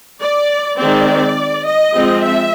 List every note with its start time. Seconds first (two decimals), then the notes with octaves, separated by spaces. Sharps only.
0.21 D5
0.79 D#3 G#3 C4 D5
1.66 D#5
1.94 F3 G#3 C4
2.23 E5